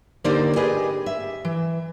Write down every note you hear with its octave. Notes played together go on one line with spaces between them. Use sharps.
D3 A#3 D#4 G4 C5 D5
G4 G#4 B4 D#5 G#5
E5
E3